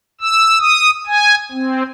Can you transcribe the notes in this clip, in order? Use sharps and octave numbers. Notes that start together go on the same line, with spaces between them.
E6
D#6
G#5
C4